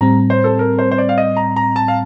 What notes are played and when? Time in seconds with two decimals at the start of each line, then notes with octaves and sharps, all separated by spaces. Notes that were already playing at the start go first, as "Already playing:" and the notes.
0.01 A2 G3 C4 A#5
0.30 C5
0.44 A4
0.59 A#4
0.79 C5
0.91 C5
0.98 D5
1.09 F5
1.18 D#5
1.37 A#5
1.56 A#5
1.76 A5
1.88 F5